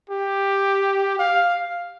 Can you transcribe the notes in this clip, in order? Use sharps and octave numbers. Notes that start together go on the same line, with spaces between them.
G4
F5